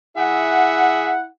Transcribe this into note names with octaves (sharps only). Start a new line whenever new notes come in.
E4 G#4 E5 F#5